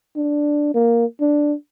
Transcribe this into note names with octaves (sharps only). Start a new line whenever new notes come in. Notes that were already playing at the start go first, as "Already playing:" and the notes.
D4
A#3
D4